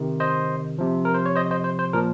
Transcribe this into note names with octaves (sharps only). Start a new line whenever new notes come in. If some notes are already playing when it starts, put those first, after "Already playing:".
Already playing: C3 D#3
C5 D#5
C3 F3
A#4
C5
C#5
C5 D#5
C5 D#5
C5
C5
A#2 F3 A#4